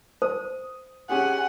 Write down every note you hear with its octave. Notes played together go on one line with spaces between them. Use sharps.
C5 D#6
C#4 G4 G#4 F#5 G#5